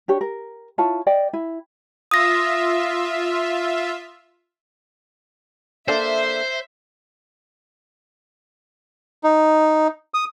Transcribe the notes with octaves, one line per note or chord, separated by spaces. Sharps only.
D4 G4 C#5
A#4
E4 F4 C#5 A5
D5 D#5 G5
E4
F4 E5 D#6 A#6
A#3 D4 A4 C5 E5
D#4
D#6